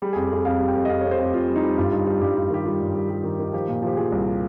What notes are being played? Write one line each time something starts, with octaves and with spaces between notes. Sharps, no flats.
G3 G#4
F2 G#4
G4
F2 G#4
F2 F5
G3
G5
F2
D#5
F2 F5
F2 C#5
C5
F2 G4
F2 F4
G3
D#4
G3
G2 F4
G3 D#4
G3 F4
G2 G4
G2 F4
D#3 G4
G3 F4
G2
G3
G3
D#3
D#3
F3 G4
A#2
F3 G4
F3 G#4
C2